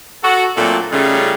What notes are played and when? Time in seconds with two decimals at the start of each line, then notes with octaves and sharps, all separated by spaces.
0.23 F#4 A4
0.57 A#2 F#3 A3 C4 D4 A4
0.92 C#3 G3 A3 C#4 D#4 F4